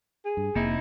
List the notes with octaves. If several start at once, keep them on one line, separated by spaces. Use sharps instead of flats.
G#4
G2
F1 C3 A#3 D#4 E4